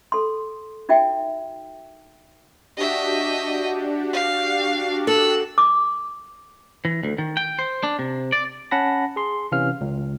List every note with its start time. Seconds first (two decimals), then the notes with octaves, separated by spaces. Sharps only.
0.12 A4 C6
0.89 D#4 F#4 E5 G5
2.77 D4 F#4 G4 D#5 E5
4.13 F5
5.07 A4 E6 F#6
5.58 D6
6.85 E3
7.03 D2
7.18 D#3
7.37 G5
7.59 C5
7.83 D4
7.99 C3
8.32 D5
8.71 C#4 F#5 A5 B5 A#6
9.16 G#4 C6
9.52 C3 E3 C#4 F5 F6
9.81 C#2